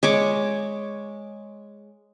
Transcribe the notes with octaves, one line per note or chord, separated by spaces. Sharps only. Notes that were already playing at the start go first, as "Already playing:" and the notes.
G#3 C#5 D6